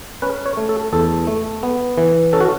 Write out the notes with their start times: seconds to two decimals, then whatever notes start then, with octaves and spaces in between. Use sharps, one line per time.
0.22 C#4 B4
0.46 C#5
0.57 A3
0.69 A4
0.93 E2 A4
1.27 A3
1.63 B3
1.98 E3
2.33 C#4 A4
2.40 F#4